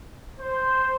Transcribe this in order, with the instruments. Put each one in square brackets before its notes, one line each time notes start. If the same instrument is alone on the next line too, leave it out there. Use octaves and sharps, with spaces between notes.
[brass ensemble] C5